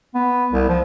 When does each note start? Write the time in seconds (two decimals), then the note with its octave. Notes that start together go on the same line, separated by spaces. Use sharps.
0.14 B3
0.53 C2
0.69 F3